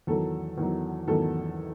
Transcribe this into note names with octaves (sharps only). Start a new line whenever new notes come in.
E2 D#3 F#3 A4
E2 D#3 F#3
E2 D#3 F#3 A4